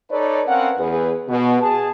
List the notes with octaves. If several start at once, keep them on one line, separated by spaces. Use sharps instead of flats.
D#4 A4 B4 C#5 D5
C4 C#4 A#4 B4 F5 F#5
E2 G#4 B4
B2
G#4 A5